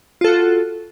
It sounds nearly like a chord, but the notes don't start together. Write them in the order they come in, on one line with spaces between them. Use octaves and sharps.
F4 A4 F#4